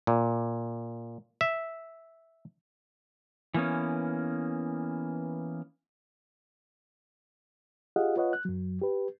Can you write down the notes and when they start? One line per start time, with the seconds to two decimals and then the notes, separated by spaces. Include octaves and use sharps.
0.07 A#2
1.41 E5
3.54 E3 A#3 B3 C#4
7.96 F4 G4 G#4 D#5 F5 F#5
8.16 F4 B4 C#5 D#5 F#5
8.33 F#6
8.45 F#2 F#3
8.82 G4 B4